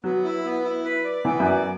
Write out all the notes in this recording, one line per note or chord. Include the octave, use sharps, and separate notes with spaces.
F#3 B3
E4
B3
E4
B4
D5
E3 B3
F#2 D5